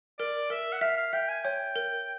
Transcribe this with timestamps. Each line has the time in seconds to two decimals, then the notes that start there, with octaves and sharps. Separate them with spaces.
0.19 A#4 D5
0.50 A#4 E5
0.73 F#5
0.81 E5 F5
0.97 F5
1.13 E5 G5
1.28 G#5
1.44 C#5 G5
1.76 A#4